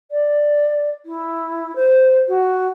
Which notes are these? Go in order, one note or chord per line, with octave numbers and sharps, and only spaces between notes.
D5
E4
C5
F#4